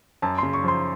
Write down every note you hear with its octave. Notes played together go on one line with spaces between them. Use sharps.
F#2 A5
C#3 C6
C#6
F3 C6